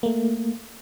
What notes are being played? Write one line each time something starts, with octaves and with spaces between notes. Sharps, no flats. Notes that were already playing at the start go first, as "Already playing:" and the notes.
A3 A#3